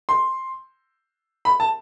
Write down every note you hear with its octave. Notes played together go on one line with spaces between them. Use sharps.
C6
B5
A5